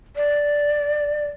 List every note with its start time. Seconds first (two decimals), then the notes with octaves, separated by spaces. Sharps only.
0.16 D5